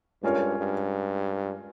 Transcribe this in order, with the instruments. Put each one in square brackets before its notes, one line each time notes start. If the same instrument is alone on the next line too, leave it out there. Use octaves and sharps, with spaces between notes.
[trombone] G2 [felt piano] G#3 C#4 F4 A#4 C#5
[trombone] G2